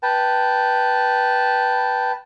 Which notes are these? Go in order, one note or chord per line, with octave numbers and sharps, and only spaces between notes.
B4 G5 A5